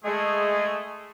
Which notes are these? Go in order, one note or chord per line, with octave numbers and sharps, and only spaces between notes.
G#3 A3 G#4